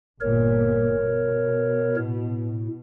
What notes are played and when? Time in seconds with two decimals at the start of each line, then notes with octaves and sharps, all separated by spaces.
0.21 G1 A#2 A#4 C#5
1.00 B2
1.97 A2